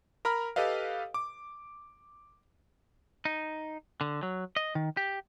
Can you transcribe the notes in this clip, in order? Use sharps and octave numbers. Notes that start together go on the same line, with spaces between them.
A#4 A#5 B5 F6
G4 A4 B4 D#5 F5
D6
D#4
D3
F#3
D#5
D#3
G4